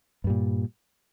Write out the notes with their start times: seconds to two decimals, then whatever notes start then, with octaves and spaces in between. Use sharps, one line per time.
0.24 G2
0.27 G3
0.30 A#2